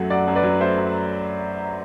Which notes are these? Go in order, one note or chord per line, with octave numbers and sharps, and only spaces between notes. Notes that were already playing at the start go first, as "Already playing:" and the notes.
Already playing: F#2 F#3 A3 F#5
F#2 D5 F#5
F#2
B4 D5
F#3
A3 C5 E5
F#2